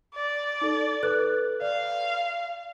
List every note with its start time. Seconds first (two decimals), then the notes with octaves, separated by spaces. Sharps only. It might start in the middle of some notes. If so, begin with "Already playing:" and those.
0.14 D5
0.61 D#4 A4
1.03 A4 B4 F#6
1.61 D5 F5